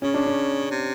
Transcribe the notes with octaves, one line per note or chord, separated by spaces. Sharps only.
C#3 C#4
D4
C#4
C3